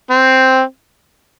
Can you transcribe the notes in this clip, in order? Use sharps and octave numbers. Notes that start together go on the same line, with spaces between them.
C4